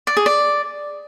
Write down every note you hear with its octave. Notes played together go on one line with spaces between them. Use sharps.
D5
G#4
D5